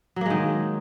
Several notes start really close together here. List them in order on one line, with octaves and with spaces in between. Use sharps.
F#3 A#3 G#3 D#3